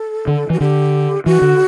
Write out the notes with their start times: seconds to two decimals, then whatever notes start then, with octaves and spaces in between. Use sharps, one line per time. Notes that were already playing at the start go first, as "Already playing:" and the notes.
Already playing: A4
0.27 D3
0.50 E3
0.53 F#4
0.61 D3 G4
1.26 E3 F#4
1.42 D3